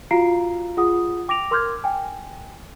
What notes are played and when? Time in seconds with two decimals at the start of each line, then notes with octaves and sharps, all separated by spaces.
0.11 F4 F#4 F5 A#5 C7 D7
0.77 F4 G#4 F#5 D#6
1.28 G5 D6 A#6 D7 F7
1.51 A#4 C6 D6 F6 G6 G#6
1.84 G5 G#5